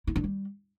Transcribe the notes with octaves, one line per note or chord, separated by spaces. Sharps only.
E4
D4
G3